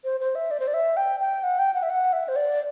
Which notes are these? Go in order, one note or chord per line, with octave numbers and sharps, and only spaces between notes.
C5
C5
E5
D5
C5
D5
E5
G5
G5
F#5
G5
F#5
E5
F#5
E5
C5
D5